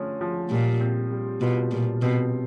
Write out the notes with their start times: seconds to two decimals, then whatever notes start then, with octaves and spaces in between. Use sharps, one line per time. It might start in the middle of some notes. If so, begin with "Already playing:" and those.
Already playing: D3 F3 A3 C#4
0.21 F3
0.50 A#2 G3
0.80 C4
1.11 G3
1.41 B2 F4
1.71 A#2 G3
2.02 B2 C4